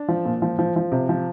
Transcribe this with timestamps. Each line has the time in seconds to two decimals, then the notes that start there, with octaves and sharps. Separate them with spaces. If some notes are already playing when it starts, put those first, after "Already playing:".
Already playing: D4
0.08 F3
0.25 A#2
0.42 F3
0.59 F3
0.76 F3
0.92 C3
1.09 F3